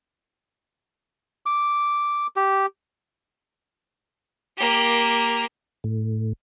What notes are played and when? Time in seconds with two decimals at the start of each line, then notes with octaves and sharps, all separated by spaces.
1.46 D6
2.36 G4
4.57 A#3 G4
5.84 A2